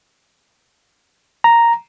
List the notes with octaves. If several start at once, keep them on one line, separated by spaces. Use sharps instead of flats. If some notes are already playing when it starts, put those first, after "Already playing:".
A#5